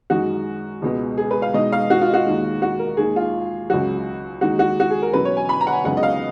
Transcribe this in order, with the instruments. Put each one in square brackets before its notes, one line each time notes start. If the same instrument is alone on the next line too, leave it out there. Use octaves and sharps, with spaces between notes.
[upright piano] F#2 D#3 G#3 F#4
C#2 B2 G#3 B3
G#4
B4
F5
B2 G#3 D#4 D#5
F5
F#4
F4
F#4
D#2 D#3 G#3
F#4
A#4
D#2 D#3 G#3 G#4
F4
C#2 C#3 F#3 F#4
D#2 D#3 G#3 D#4 F#4
F#4
F#4
G#4
A#4
B2 F#3 C#4 B4
C#5
G#5
B5
A#5
F#5
G#5
C#2 C#3 F#3 B3 D#4 F#5
D#5
F5